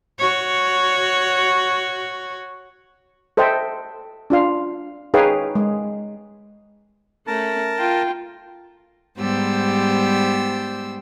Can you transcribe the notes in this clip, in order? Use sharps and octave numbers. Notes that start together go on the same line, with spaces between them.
F#4 C#5
A4 C5 D#5 E5 G5
D4 F4 F5
D#4 G#4 B4 C#5 F5 G5
G#3
A3 C#4 A#4 A5
F4 G5
G#2 G3 B3 G4 C5 E6